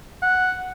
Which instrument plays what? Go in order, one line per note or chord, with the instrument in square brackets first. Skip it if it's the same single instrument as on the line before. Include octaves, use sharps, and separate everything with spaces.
[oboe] F#5